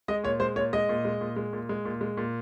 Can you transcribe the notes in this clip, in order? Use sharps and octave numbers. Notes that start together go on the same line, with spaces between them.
G#3 D#5
A#2 C#5
G#3 C5
A#2 C#5
G#3 D#5
A#2
G#3
A#2
G#3
A#2
G#3
A#2
G#3
A#2